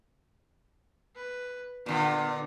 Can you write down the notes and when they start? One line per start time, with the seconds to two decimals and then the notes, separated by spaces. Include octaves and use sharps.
1.16 B4
1.86 A#2 D3 B3